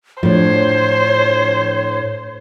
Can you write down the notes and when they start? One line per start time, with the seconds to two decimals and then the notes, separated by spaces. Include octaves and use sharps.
0.23 A2 F3 D4 C5 C#5